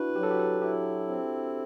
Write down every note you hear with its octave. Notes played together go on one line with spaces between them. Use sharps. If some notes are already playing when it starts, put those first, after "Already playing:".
Already playing: D4 E4 F#4 B4
F#3 G4
A4
G4
A4
E4 G4
C4